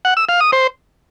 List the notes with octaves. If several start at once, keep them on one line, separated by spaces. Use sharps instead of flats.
F#5
E6
F5
D#6
C5